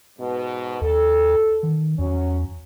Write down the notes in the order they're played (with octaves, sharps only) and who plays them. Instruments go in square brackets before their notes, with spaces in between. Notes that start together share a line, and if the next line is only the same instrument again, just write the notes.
[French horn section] G#2 B2
[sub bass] D#2 [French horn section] A4
[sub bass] D#3
[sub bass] E2 [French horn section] F#3 C#4